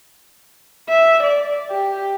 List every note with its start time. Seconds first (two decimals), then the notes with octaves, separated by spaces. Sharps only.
0.90 E5
1.23 D5
1.70 G4